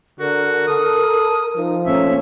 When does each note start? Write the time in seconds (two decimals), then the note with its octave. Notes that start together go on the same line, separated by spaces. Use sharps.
0.20 D3 F#4 A#4
0.67 A4 D#6
1.56 F3 D#4
1.86 A3 A#3 C#4 E5